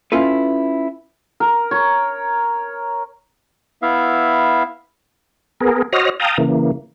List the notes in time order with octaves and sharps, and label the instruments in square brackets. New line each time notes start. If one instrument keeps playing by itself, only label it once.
[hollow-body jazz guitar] C#4 E4 F4 A4 B4
[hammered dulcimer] A#4
C#5
[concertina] B3 E4 E5 F5
[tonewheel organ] B3 G#4 A#4
F#4 C5 C#5 D#5 F6 A#6
F5 G5 A5 A#5 D#6
C#3 E3 A#3